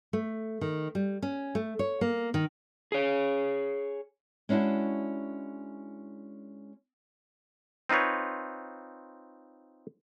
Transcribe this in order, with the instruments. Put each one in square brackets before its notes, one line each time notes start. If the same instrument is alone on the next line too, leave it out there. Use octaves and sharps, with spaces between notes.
[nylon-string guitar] A3
D#3
G3
C#4
A3
C#5
A#3
D#3
[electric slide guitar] G#4 C#5
[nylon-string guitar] G#3 C#4 D4 E4 F#4
[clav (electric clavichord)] C4 D#4 F4 B4 C#5